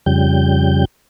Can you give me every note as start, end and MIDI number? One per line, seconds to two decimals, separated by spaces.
0.06 0.85 41
0.06 0.85 49
0.06 0.85 55
0.06 0.85 91